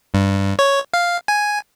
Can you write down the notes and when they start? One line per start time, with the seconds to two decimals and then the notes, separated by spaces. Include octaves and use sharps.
0.14 G2
0.59 C#5
0.93 F5
1.28 G#5